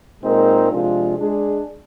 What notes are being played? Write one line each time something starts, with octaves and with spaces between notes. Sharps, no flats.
A#2 G#3 C4 D#4 A#4
C3 F3 G#3 D4 F4
G#3 D4 G#4